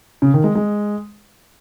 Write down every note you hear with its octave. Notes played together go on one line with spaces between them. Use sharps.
C#3
D#3
G#3
G#3